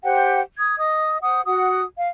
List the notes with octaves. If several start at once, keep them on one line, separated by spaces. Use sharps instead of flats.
G4 C5 F#5 G5
D#6 G#6
D#5 D#6
C5 F#5 D#6
F#4 F#5 D#6
F5